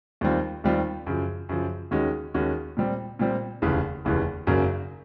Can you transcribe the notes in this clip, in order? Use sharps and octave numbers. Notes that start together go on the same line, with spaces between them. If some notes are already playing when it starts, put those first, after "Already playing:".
D#2 D#3 G3 C4 F4
D#2 D#3 G3 C4 F4
F#2 C#3 F3
F#2 C#3 F3
D#2 D#3 G#3 C#4 F#4
D#2 D#3 G#3 C#4 F#4
A#2 G3 C4
A#2 G3 C4
F1 D#2 C#3 E3
F1 D#2 C#3 E3
G#1 F#2 C#3 F#3 A#3